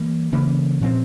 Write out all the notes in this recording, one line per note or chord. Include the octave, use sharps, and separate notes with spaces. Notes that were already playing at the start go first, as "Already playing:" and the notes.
Already playing: E3 G3 A#3
C#3 E3 A#3 C#4
A#2 F3 C4